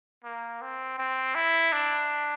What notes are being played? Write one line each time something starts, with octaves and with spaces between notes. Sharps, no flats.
A#3
C4
C4
E4
D4